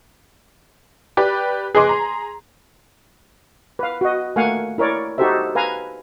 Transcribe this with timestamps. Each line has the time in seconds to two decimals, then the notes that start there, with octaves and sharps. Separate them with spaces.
1.17 G4 B4 D5
1.75 G#4 B4 D#5 C6 D6
1.89 A#5
3.79 B4 F5
4.01 F#4 D#5
4.36 A3 A#3 F5 F#5 G#5
4.78 E4 A#4 C#5 D5
5.18 D#4 F#4 G4 A4 C5 E5
5.55 B4 F5 G#5 A#5